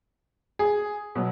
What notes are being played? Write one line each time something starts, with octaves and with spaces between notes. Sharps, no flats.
G#4
B2 F#3